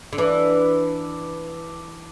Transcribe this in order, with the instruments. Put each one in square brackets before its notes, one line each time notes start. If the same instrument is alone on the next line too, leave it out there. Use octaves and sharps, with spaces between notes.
[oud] D3
[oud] E3 [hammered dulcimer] D4